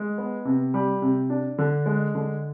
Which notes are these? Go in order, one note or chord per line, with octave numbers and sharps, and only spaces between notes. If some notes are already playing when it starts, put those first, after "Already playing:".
Already playing: G#3
B3
C3
G3
C3
D4
D3
G#3
D3